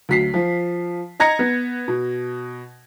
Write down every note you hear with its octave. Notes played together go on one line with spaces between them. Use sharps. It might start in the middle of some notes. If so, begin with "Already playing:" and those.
D2 F#3 B6 C7
F3
D#5 A#5 G#6 A#6 C#7
B3
B2